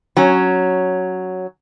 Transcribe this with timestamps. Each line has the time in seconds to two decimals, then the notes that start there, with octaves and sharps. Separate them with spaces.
0.17 F#3 C#4